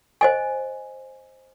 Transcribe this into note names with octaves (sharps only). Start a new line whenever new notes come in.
C5 D#5 G#5